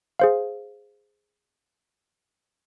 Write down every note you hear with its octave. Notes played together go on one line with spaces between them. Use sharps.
G#4 C5 F5